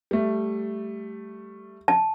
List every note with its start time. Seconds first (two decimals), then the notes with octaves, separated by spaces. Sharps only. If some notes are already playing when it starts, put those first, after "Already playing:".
0.11 G3 A3
1.88 A5